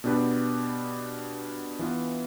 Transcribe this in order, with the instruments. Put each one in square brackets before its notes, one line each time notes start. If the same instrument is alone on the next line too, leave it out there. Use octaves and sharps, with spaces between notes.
[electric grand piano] B2 B3 D4 G4 B4
E3 B3 F4